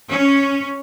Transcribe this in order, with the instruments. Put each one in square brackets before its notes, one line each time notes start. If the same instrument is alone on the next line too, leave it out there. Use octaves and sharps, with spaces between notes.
[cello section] C#4